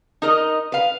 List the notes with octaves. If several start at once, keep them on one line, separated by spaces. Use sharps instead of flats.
D#4 A#4 D#5
B4 F5